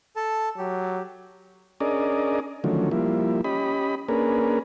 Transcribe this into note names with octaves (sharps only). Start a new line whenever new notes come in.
A4 A5
F#3 G4
C#4 D4 G#4 A#4 D5 D#5
D3 D#3 F3 F#3 A3 C#4
F3 G3 A#3 E4
C#4 G4 D#5 B5
A#3 C#4 D4 G#4 A#4 B4